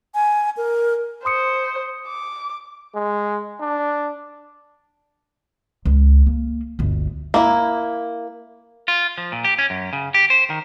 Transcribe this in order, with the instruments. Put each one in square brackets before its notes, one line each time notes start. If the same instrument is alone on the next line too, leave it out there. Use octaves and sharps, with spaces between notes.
[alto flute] G#5
A#4
[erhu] C5 [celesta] C6 D#6 C#7
[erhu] D6
[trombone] G#3
D4
[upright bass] C#2
A#3
G1 D2
[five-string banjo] A#3 E4
[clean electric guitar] F4
F3
A#2
G4
C#4
F#2
C#3
G4
C5
D#3